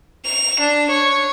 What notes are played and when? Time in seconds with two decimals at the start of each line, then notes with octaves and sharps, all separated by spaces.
0.25 F7
0.60 D4
0.90 C#5